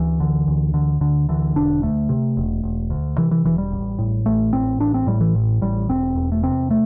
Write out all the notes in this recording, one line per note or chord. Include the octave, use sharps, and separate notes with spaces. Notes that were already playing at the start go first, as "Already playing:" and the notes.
Already playing: D2 E3
D3
D2
D3
D2 D3
D3 E3
E1 D4
D2 A3
C3
E1
E1
D2
C3 E3
E3
E1 E3
G3
A1
A2
A1 A3
A2 C4
A1 D4
C4
A2 G3
E3
A1
A2 G3
E1 C4
E2
A3
C3 C4
A3